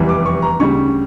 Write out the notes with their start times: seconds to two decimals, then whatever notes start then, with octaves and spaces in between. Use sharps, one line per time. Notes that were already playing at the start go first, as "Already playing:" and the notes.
Already playing: F1 E2 E3 G3
0.09 D6
0.26 C#6
0.42 A#5
0.59 D2 C#3 G3 C#6